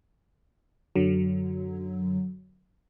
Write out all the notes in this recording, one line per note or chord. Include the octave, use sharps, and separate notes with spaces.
F#2 D3 F#3